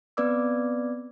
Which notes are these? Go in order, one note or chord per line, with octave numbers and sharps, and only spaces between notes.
B3 C4 B4 D5 D6 E6